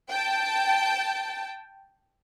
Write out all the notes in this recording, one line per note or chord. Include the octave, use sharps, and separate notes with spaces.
G5 A5